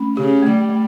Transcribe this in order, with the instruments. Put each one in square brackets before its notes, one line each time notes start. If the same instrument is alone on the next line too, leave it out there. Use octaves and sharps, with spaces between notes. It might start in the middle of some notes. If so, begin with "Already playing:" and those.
Already playing: [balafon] A3 C#4
[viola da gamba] C#3 [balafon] G4
[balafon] A3
[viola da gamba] G3
[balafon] A3